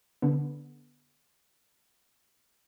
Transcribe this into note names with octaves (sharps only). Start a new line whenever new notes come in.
D3 B3